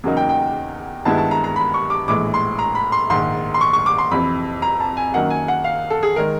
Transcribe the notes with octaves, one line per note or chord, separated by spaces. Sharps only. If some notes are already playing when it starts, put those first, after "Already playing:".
E2 C#3 F#3 A#3 D#4
G5
G5
G2 D#3 G#3 B3 E4 A5
A5
A#5
A#5
B5
C#6
D6
A#1 A2 E3 G#3 D6
C6
A#5
B5
C6
A#1 G#2 D#3 C6
C6
C#6
C#6
D6
C6
F2 C3 E3 B5
A#5
A5
G#5
F#2 D#3 F#3 A#3 D#4 F#5
G#5
F#5
F5
A4
G#4
D#3 G#3 A#4